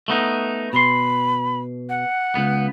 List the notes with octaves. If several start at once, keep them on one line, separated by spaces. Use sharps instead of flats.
A3 B3 D#4
B2 B5 C6
F#5
C#2 B3